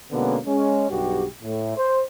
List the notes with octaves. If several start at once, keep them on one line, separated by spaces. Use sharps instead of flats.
B2 D3 G#3 A#3 B3 C#4
G#3 C#4
B1 G2 F#4 G4
A2 A3
C5